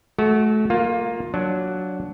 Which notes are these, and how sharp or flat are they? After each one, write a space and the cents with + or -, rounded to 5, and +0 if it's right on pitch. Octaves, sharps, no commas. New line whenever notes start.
A3 -30 F#4 +0
A#3 +0 F4 +20
F#3 +0 D4 -10